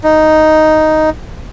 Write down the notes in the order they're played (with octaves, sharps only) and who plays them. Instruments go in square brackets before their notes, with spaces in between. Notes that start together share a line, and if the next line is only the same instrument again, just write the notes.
[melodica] D#4